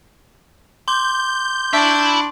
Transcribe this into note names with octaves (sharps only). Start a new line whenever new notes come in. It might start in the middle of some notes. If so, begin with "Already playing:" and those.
C6 D6 G6
D4 E5 B5 C#6